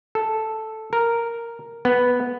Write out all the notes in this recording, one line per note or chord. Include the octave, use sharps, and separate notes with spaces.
A4
A#4
B3